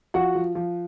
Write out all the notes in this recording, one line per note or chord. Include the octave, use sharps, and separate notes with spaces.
F3 F#4 F#5
F3
F3